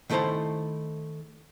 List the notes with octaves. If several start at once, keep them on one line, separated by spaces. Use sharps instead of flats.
D#3 A3 E4 A4 C5 A#5